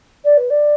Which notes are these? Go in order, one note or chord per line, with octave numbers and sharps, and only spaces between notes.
D5
B4
D5